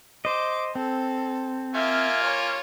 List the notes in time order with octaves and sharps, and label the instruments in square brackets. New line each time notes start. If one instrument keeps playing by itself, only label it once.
[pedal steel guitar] C5 D#5 [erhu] D6
[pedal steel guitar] C4 [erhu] A4
[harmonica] A#3 F4 G#5 [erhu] E5
[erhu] C#5